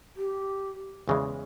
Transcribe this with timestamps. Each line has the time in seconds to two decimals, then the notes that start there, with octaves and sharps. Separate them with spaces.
0.17 G4
1.08 E2 C#3 E3 G#3